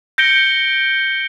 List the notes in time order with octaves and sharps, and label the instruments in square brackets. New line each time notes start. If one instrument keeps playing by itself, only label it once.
[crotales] G6 A#6 C#7 D7 G7